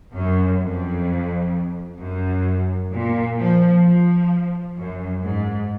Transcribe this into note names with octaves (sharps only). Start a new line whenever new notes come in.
F#2
F2
F#2
A#2
F3
F3
F#2
G#2